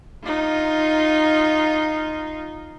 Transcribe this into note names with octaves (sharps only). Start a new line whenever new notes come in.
D#4 F4